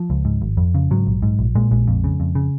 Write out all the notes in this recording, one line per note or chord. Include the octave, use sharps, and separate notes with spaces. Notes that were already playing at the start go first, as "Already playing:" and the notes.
Already playing: F3
C#2
G#2
G#1
F2
C#3
G#2 F#3
A#1
G#2
A#1
A#2 G#3
A#1 G#3
F2
C#3
F2
C#3